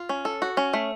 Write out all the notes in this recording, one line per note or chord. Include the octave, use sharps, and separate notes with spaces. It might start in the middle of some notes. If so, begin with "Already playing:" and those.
Already playing: F4
C#4
A4
F#4
C#4
A3